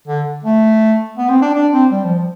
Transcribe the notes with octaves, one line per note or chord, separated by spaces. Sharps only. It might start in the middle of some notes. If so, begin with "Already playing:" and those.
D3
A3
B3
C4
D4
D4
C4
G3
F3
F3